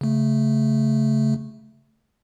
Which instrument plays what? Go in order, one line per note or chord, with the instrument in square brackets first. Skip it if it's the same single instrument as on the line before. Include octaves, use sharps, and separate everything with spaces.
[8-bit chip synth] C#3 A3